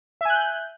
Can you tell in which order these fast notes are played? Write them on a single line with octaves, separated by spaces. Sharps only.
E5 G#5 F#6 G6